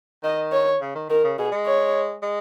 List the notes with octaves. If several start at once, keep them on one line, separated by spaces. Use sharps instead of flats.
D#3 D#5
C#5
C#3
D#3
D#3 A#4
C#3
B2 G#4
G#3
C#5
G#3